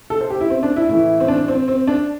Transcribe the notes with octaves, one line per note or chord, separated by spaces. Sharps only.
A4
C5
G4
E4
C4
D4
E4
A2 E3 E4
C4
D4
C4
C4
D4